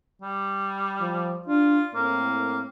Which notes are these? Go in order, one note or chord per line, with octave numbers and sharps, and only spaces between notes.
G3
F3
D4 F4
A2 A#3 C4 A#4